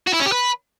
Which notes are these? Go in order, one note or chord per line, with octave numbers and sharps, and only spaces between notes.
F#4
E4
C#4
G4
B4